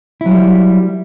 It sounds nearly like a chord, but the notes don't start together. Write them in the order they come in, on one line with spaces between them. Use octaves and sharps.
E4 F#3 G3